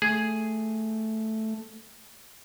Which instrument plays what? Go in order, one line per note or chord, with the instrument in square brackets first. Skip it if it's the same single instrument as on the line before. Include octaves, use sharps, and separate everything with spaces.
[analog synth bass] A3 [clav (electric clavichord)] G#4